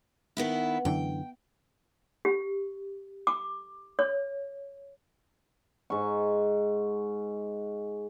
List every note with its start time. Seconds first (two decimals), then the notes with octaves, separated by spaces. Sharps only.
0.37 D#3 B3 E4
0.85 F#2 D3 E3 G5
2.25 G4
3.27 D6
3.99 C#5
5.90 G#2 C#6